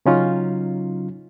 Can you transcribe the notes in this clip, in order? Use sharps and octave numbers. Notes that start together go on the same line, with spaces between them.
C#3 F#3 C#4 D#4 F4